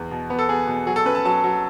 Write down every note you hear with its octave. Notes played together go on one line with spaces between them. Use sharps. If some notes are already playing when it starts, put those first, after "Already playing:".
Already playing: E2
B2
B3
A4
B3 G#4
B2
F#3 G#4
A4
C#4 B4
A5
F#3 A5
F#3